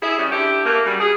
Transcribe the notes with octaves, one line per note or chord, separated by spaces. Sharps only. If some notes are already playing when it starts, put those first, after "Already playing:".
E4 G#4
E3 G3 C#4
D3 E4 G4
A3 A#3
C#3 F#3 G3
G#4